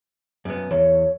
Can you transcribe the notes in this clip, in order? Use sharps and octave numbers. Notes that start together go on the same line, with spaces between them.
F#2 B3
E2 C#5